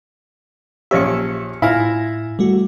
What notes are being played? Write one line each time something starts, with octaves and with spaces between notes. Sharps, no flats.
A#1 C#4 G4 E5 C#7
A2 E4 F4 F5 G#5 A#6
G3 A3 F#4